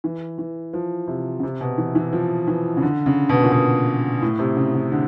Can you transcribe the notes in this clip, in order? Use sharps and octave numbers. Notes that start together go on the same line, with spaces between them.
E3
E3
F3
C3
C#3
C3
B2
E3
E3
F3
E3
C#3
D3
C#3
B2
A#2
B2
A2
C3
C#3
C#3
D3